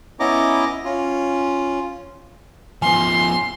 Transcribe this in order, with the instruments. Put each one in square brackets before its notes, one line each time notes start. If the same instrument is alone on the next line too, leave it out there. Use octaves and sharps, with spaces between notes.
[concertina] B3 C#4 E4 D#5 A#5 D6
C#4 F4
[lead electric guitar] F3 B3 [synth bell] G#5 [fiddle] C6